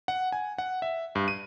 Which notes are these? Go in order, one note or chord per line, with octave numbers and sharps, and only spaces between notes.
F#5
G#5
F#5
E5
G2
D#7